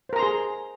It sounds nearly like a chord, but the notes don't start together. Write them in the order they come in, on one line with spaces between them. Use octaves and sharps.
C5 A#4 A#5 C6 G#4